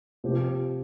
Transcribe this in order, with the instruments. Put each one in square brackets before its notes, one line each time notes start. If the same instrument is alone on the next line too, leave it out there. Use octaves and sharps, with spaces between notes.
[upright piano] C3 F3 C4 G4